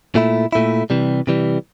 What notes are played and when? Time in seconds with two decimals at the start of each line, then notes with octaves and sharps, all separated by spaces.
0.15 A#2 A3 E4
0.53 A#2 A3 E4
0.90 C3 E3 G3
1.27 C3 E3 G3